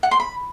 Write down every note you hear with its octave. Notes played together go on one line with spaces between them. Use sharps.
F#5
C6
B5